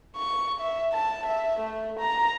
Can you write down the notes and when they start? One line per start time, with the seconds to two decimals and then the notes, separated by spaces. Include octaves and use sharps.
0.16 C#6
0.60 E5
0.93 A5
1.26 E5
1.60 A3
2.00 A#5